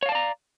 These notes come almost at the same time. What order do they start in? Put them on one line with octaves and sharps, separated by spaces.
C#5 F5 A5 D5 A#5